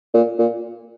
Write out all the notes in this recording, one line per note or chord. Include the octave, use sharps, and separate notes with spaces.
A#2
A#2